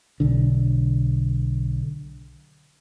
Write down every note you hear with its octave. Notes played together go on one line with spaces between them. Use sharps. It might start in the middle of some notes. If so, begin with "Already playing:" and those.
B1 D3